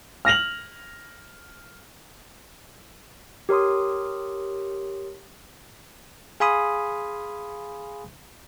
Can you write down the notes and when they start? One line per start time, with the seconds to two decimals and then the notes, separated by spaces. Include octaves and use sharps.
0.25 F6 A#6 F7 F#7
3.49 G4 A#4 C#5 C6 D#6
6.40 G#4 F5 G#5 B5 C6 D#6